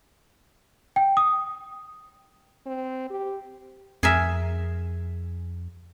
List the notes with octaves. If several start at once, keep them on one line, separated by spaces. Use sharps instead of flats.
G5
D#6
C4
G4
F2 G#4 A#4 E5